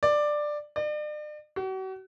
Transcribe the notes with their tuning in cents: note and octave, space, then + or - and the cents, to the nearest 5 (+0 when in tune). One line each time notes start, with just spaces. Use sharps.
D5 +10
D5 +40
F#4 +40